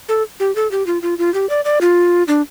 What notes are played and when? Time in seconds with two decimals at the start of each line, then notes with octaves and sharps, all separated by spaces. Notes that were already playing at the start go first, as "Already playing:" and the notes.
0.09 A4
0.40 G4
0.56 A4
0.71 G4
0.87 F4
1.02 F4
1.18 F4
1.34 G4
1.50 D5
1.65 D5
1.81 F4
2.28 D4